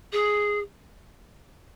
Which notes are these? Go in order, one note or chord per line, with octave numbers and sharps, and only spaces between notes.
G#4